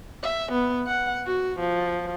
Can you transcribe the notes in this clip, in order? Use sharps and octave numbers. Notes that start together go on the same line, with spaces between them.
E5
B3
F#5
F#4
F3